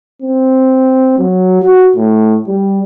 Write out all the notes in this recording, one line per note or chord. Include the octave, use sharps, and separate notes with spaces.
C4
F#3
F#4
A2
G3